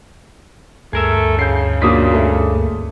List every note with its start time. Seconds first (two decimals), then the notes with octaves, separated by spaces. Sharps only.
0.93 D2 G2 A3 G#4 A#4 E5
1.39 C#3 G6 C7
1.82 B2 A#3 D4 F4 D#6 B6
2.13 A3